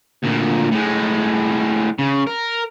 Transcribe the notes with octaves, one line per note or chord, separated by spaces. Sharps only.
D2 A#2
A2 G#3
C#3
A#4